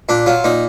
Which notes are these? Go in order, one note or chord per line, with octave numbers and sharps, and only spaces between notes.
A#2 D4
F#3 F4
A#2 D#4